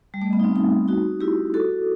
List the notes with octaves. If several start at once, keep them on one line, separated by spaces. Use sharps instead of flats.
G3
A3
B3
D#4
C4
D#4
D#4 F#4
E4 G4
F#4 A4